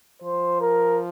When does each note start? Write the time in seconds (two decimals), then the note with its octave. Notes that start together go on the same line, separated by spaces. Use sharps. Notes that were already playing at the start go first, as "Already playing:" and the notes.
0.22 F3 C5
0.61 A#4